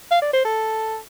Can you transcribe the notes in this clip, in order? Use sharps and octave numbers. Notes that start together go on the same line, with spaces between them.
F5
D5
C5
A4